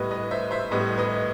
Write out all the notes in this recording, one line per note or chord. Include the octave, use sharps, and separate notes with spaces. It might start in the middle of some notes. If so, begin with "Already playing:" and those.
Already playing: A2 G3 B3 B4 D#5
B4 D#5
C5 E5
C5 E5
A2 G3 B3 B4 D#5
B4 D#5